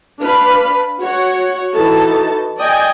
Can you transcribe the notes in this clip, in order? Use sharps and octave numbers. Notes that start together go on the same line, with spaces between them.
D4 B4 F5 B5
F#4 C#5 F#5
E3 D#4 F#4 A4 A5
D5 D#5 G5 G#5